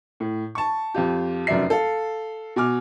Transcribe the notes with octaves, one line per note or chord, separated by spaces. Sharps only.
A2
A5 C#6
F2 F4 G4
F1 F#2 D5 E5 C7
A4 F5
B2 G#5 D6 F6